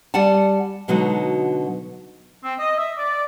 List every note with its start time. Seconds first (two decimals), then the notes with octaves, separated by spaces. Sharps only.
0.14 G3 D5 F#5 G#5 A5
0.88 B2 D3 F#3 G#3 D#4 F#4
2.43 C4
2.59 D#5
2.77 E5
2.97 D5